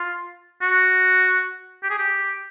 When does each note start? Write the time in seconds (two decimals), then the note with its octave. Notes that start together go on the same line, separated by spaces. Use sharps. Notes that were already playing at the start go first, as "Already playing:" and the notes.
Already playing: F4
0.62 F#4
1.83 G4
1.90 G#4
1.99 G4